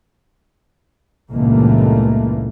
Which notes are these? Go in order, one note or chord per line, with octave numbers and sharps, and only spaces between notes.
C#2 G2 A#2 E3 A3 A#3